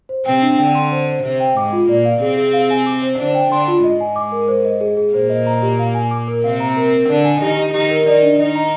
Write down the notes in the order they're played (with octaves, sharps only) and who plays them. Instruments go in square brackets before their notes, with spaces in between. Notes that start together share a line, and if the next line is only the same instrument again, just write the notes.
[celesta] C5
[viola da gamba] C3 C4 [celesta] G5
[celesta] D4
[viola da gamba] D3 [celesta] G5
[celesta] C6
C5
C5
[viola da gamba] C3 [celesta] C5
[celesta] G5
[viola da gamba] G#2 G#3 [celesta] D6
[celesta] F4
[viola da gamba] A#2 A#3 [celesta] D5
[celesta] F5
[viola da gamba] C3 C4 [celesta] G#4
[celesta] G#4
F5
G#5
D6
C5
[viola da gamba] D3 D4 [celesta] C5
[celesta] G5
[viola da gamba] D3 D4 [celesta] C6
[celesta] F4
[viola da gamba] G#2 G#3 [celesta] D#5
[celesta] G#5
D6
A#4
C5
D#5
G#4
G#4
[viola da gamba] A#2 A#3 [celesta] C5
[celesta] D#5
A#5
G4
F5
G#5
D6
A#4
[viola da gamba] C3 C4 [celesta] F5
[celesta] A#5
A#4
A#4
[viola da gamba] D3 D4 [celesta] D5
[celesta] G#5
[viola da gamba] D#3 D#4 [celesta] G4
[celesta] G4
[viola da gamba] D#3 D#4 [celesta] G4
[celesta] A#4
[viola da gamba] D#3 D#4 [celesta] D5
[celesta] D4
[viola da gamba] D#3 D#4 [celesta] D#5
[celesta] A#5